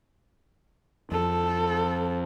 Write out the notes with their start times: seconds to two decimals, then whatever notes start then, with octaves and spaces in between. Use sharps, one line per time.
1.12 F2 A4